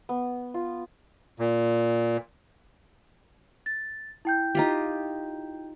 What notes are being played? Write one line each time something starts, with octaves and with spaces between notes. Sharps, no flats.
B3
F4
A#2
A6
E4 G5 G6
D#4 F4 G4